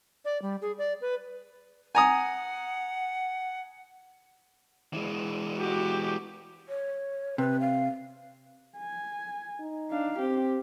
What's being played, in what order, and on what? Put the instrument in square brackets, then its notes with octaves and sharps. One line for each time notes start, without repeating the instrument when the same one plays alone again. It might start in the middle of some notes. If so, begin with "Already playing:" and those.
[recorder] D5
G3
G#4
D5
B4
[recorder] F#5 [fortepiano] G#5 A#5 D#6
[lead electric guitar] E3 G#3
[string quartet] F#4 G4
[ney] C#5
[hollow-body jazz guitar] C3 [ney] B4
[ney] F5
[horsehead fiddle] G#5
[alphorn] D#4
[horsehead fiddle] D4 F5
[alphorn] C4 [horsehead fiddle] G4